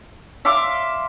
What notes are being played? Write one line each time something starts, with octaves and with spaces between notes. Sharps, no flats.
E5 F5 C6 D6